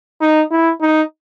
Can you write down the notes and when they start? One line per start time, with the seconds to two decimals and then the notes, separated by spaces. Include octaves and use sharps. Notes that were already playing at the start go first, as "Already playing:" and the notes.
0.21 D#4
0.51 E4
0.81 D#4